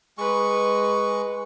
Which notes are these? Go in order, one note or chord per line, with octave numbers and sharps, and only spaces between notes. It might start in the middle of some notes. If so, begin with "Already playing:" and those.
G#3 B4 C#6